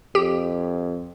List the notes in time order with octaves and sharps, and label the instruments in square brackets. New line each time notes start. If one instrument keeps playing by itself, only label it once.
[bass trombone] F2 [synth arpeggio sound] G4